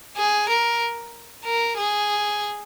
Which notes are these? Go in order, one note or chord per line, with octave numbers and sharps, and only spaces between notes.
G#4
A#4
A#4
G#4